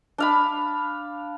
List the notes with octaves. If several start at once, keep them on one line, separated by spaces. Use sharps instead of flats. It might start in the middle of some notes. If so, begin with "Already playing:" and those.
D4 F5 B5